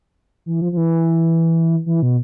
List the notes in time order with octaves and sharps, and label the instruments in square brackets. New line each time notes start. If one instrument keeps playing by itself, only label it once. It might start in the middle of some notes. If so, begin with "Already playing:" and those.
[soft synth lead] E3
F3
F3
E3
E3
B2